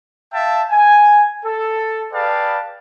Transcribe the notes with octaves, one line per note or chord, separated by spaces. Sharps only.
E5 F5 G5 A5
G#5
A4
G#4 B4 D5 F5 G5 A5